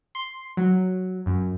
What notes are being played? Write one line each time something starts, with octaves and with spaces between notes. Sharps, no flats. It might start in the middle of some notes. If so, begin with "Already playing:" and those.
C6
F#3
F#2